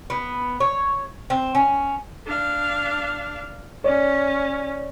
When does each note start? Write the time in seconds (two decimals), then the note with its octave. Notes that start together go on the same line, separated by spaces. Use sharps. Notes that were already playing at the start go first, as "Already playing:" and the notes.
0.10 B3
0.60 C#5
1.30 C4
1.55 C#4
2.27 D4 F5
3.84 C#4 C#5 D5